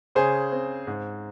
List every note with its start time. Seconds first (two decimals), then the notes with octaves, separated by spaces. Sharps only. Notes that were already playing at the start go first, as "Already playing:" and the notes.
0.15 C#3 G#4 C5
0.52 C4
0.87 G#2